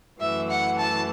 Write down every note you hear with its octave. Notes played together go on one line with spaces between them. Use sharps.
F#2 E3 A3 E5
F#5
A5